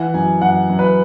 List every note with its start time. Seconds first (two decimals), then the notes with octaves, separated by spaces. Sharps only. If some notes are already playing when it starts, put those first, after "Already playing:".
Already playing: E3 F#5
0.14 F#2 G#5
0.41 F#2 F#5
0.69 F#2
0.79 B4